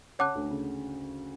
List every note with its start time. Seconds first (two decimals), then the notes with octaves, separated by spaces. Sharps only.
0.19 C#3 C#5 F#5 A5 D6 F#6
0.35 D2 D3
0.51 C#3